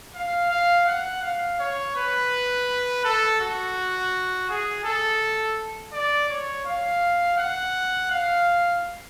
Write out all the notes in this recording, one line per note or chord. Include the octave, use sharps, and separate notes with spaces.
F5
F5
F#5
F5
C#5
B4
A4
F#4
G#4
A4
D5
C#5
F5
F#5
F5